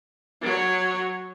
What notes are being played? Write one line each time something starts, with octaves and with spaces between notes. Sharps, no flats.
F#3 C#5